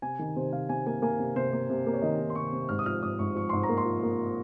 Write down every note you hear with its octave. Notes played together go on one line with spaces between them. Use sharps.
C3 G#5
D#3
C3 C5
C3 F5
C3 G#5
A#3 G#5
A#3 G#5
C3
C3 C5
A#3
C3
A#3
C#5
D#3 D#5
D#3
C6
C3 C#6
C3
G#2 F6
D#6
F3 F6
G#2 D#6
G#2 C#6
F3 C#6
G#2 C6
A#5
A#3
C6
F3
A#3